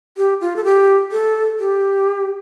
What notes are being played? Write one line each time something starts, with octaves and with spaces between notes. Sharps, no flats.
G4
F4
A4
G4
A4
G4